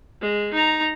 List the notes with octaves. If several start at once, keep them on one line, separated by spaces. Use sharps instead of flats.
G#3
D#4 A#5